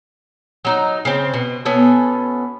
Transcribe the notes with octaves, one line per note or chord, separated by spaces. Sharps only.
F#3 D#4 A#5
C#3 C4
B2
B2 B3 C#4 A4